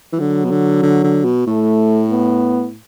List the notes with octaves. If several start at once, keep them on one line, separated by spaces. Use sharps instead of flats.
E3
D3 F#3
B2
D3
D3
D3
B2
A2 A3
B3